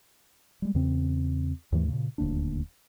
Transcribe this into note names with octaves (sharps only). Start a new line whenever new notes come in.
G3 G#3
E2 C#3 C4
D#2 G#2 E3 A3
A#2 C#3
D#1 D2 A#3 D4